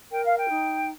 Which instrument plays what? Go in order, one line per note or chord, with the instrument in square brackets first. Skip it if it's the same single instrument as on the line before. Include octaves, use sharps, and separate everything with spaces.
[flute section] A#4 G5
F5
G5
D#4